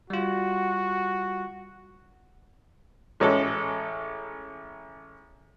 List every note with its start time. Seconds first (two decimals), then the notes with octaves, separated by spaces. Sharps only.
0.10 G3 F4 F#4
3.20 A1 G#3 C#4 A4